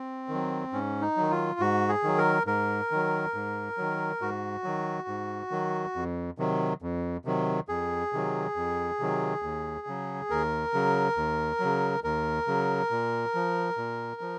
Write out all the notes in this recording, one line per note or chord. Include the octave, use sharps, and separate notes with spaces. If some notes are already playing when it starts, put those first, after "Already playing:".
Already playing: C4
D#3 F#3
G#2 C#4
D#4
D#3 F#3
F4
G#2 F#4
G#4
D#3 F#3
A#4
G#2 A#4
D#3 F#3
G#2
D#3 F#3
G#2 F#4
D#3 F#3
G#2
D#3 F#3
F2
C3 D#3 F#3
F2
C3 D#3 F#3
F2 G#4
C3 D#3 F#3
F2
C3 D#3 F#3
D#2
C#3 F#3
D#2 A#4
C#3 F#3
D#2
C#3 F#3
D#2 A#4
C#3 F#3
A#2
F3
A#2
F3